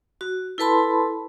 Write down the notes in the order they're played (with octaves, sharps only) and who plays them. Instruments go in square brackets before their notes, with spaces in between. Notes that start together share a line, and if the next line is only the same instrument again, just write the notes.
[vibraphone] F#4
E4 A4 B4 A5 B5 C6